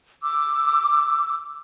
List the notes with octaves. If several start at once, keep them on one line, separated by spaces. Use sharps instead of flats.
D6 E6